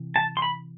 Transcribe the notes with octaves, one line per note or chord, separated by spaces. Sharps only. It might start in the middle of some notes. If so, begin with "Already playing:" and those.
Already playing: C3 E3
A5
C6
B5